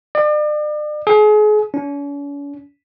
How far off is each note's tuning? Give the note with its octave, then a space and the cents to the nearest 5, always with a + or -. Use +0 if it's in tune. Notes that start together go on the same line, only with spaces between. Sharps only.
D5 +40
G#4 +35
C#4 +45